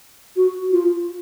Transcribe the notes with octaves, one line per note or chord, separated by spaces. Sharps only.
F#4
F4